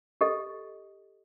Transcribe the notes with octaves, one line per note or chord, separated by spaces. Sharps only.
G4 A4 D#5